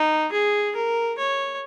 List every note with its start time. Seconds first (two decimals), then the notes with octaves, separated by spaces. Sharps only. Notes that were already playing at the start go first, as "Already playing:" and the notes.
Already playing: D#4
0.33 G#4
0.75 A#4
1.18 C#5